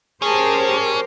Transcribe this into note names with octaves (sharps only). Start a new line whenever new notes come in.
C#4 G4 G#4 A#4 C5 A5